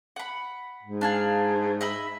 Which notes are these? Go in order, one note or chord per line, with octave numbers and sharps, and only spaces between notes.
F#5 B5
G#2
D4 F5 G#5
D#5 E5 B5